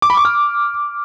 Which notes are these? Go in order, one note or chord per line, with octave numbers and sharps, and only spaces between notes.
D6
B5
C#6
F6